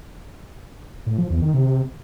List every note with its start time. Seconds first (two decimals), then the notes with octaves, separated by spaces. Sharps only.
1.06 A2
1.18 F3
1.30 E2
1.42 D#3
1.54 C3